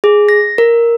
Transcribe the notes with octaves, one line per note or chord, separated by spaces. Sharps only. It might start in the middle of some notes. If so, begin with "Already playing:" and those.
G#4
A#6
A#4